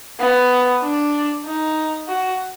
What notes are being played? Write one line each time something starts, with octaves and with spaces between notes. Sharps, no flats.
B3
D4
D#4
F#4